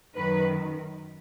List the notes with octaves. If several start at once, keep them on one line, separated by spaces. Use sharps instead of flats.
F#2 D#3 F#3 B4